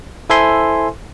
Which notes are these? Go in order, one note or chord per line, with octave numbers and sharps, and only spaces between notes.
E4 A4 C5 E5 G#5 C6